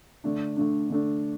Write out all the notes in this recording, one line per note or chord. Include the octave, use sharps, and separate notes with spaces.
D3 A3 D4
D3 A3 D4
D3 A3 D4